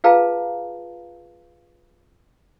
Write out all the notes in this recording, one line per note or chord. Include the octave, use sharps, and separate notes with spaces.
F4 G#4 B4 F5 A5 A#5